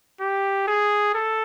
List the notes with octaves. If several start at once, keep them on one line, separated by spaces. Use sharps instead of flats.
G4
G#4
A4